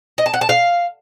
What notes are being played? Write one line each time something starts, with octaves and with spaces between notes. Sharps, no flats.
D#5
A5
F#5
A5
F5